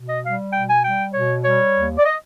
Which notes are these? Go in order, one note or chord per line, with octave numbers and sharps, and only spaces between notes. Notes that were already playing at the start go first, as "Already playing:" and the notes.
Already playing: B2
D#5
G3 F5
B2 G5
G#5
G3 G5
B2 C#5
G3 C#5
D#2
D5
D#5